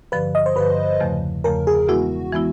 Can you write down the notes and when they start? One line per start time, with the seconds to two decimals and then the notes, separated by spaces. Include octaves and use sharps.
0.12 G2 D3 F3 B4
0.35 D#5
0.46 C5
0.56 G2 D3 F3 B4
1.00 E2 C#3 F3 A3
1.44 E2 C#3 F3 A3 A#4
1.67 G#4
1.89 E3 G#3 B3 E4 F#4
2.32 E3 G#3 B3 E4